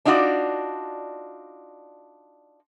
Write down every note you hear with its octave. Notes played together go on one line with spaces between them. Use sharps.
D4 D#4 F4 F#4 D5